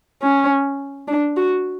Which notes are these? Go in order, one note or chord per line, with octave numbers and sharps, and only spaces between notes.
C#4
D4
F#4